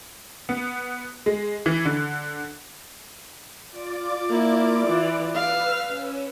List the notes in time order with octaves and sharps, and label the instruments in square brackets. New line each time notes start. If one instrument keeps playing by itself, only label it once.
[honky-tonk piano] B3
G#3
E3
D3
[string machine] F4 D5 D6
[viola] A#3 E4
E3
[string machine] B4 E6 [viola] F5
[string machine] C#4